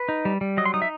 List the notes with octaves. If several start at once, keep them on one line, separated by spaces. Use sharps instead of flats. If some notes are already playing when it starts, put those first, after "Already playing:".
Already playing: B4
D#4
G3
G3
F#3 D#5
C6
D#4 D#6
E5